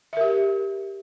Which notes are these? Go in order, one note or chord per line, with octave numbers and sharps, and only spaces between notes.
G4 A#4 E5